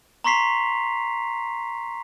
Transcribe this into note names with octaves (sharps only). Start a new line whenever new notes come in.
A#5 C6 C#6 B6 C7 F7